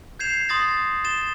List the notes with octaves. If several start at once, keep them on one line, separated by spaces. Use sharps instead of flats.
G6 G#6 C7 E7 F7
C6 D#6 A6 A#6
A6 E7 G7